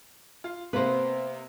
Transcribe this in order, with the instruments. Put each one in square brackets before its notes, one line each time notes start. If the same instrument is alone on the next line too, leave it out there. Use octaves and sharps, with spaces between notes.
[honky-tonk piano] F4
[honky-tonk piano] C3 A#3 B3 [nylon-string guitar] B4 C5